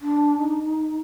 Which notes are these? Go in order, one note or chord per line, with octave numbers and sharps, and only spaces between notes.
D4
D#4